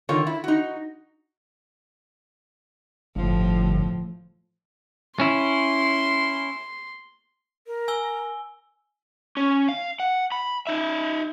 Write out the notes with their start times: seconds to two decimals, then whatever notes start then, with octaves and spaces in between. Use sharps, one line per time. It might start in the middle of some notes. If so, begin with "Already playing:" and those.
0.09 D3 D#3 F4 A#4 C#5
0.27 E4
0.44 D#4 F#4
3.16 G1 A2 F3
5.20 C#4 E4 C6
7.67 A#4
7.88 G#5 E6 G7
9.37 C#4
9.69 F5
10.00 F#5
10.32 B5
10.67 D#4 E5